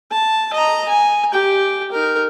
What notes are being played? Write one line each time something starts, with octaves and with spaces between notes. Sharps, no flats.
A5
D#5 A#5
G#5
G4 G5
D#4 A#4